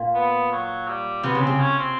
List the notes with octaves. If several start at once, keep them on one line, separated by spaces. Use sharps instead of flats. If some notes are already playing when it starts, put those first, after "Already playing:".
Already playing: A#2
B3
F#3
G3
C3 B3
C#3
C4
C3
C#4
C4